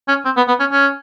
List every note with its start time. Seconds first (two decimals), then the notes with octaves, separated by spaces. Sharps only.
0.08 C#4
0.25 C4
0.37 B3
0.48 B3
0.59 C#4
0.72 C#4